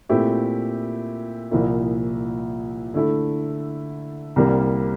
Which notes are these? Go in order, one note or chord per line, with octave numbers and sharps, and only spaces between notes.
A#2 A3 C4 E4 G4
C2 A#2 F3 A#3 E4
D3 A3 E4 A4
C2 C3 G3 A#3